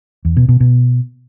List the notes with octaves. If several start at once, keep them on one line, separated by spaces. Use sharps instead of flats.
E2
B2
B2
B2